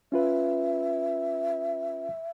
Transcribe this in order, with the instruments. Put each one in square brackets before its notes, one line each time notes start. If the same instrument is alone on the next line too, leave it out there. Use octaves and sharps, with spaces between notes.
[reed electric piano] C#4 F4 B4 [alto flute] E5